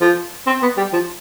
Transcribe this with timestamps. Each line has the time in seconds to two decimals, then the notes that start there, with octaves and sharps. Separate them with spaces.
0.01 F3
0.47 C4
0.62 B3
0.77 G3
0.93 F3